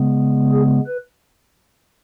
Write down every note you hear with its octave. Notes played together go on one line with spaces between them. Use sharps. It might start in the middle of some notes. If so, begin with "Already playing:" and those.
Already playing: C#3 G#3 B3
G#4
B4